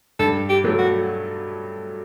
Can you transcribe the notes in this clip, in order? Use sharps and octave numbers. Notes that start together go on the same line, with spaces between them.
G2 A4
G4
F#3 A3
F#4